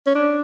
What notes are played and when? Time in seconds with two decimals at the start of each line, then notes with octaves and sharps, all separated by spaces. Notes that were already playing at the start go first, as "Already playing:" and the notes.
0.06 C#4
0.15 D4